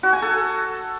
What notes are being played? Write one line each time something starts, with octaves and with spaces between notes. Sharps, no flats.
F#4
G#5
A4